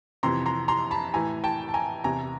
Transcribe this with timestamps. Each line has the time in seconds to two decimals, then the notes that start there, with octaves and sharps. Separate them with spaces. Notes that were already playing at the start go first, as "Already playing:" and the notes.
0.23 F2 C3 E3 A#5 C6
0.46 A#5 C6
0.68 A#5 C6
0.91 A5 B5
1.14 A2 E3 G#5 A#5
1.44 G5 A5
1.69 A5
1.74 G#5 A#5
2.04 E2 C3 E3 G#5 A#5